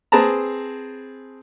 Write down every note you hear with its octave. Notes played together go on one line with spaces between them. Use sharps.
C4 G#4 B4 A5 A#5